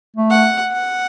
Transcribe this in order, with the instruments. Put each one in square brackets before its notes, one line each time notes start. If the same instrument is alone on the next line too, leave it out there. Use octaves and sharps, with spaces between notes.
[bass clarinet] A3
[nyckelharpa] F#5
F#5